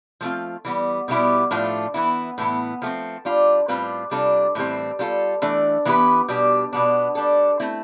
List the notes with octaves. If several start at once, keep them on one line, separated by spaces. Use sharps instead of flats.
F3 A3 C4 F4
E3 G3 B3
B2 G3 B3 E4 G4
A2 F3 A3 D4 F4
E3 B3 E4
A2 E3 B3
F3 A3 C4
G3 D4 F4
A2 G3 C4 F4 B4
C3 G3 D4 F4 A4
A2 E3 G3 C4
G3 D4 F4 A4
E3 A3 D4
E3 B3 E4 G4 B4
B2 G3 D4 G4
B2 B3 D4
G3 D4 A4
A3 C4 E4